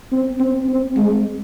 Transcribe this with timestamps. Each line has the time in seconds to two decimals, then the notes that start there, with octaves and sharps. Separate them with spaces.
0.12 C4
0.40 C4
0.69 C4
0.97 G#3